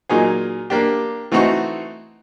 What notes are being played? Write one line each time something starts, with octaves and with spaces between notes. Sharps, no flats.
A#2 F#3 A#3 D#4 G#4
A#3 D4 G4
E3 A3 C4 D#4 F#4